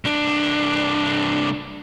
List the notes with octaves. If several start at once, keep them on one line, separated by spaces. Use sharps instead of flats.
C2 D4